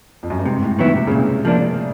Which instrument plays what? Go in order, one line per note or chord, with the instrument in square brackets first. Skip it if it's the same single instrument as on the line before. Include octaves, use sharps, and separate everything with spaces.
[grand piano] F2
F#2
G2
[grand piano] G#2 [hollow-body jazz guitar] C3
[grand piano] A2
[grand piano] A#2 [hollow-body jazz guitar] D#3 F#3 B3 E4
[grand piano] C3
[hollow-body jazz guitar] A#2 [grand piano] C#3
[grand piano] C3
[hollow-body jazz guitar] F3 A#3 D4